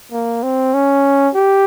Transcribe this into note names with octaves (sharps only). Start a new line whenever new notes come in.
A#3
C4
C#4
G4